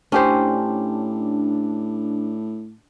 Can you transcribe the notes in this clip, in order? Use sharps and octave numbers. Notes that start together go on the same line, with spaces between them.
A2 C#4 D4 G4 C5